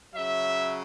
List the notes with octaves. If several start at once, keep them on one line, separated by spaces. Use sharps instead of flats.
C#3 F#3 E5